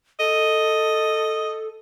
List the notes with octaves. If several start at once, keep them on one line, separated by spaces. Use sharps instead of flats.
A4 D#5